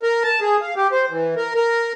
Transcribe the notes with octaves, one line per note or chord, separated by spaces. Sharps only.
A#4
A5
G#4
F5
G4
C5
E3
A#4
A#4